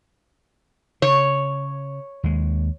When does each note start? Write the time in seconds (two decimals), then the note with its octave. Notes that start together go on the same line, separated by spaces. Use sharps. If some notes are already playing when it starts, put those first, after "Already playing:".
1.02 C#3 C#5
2.24 D#2 G#3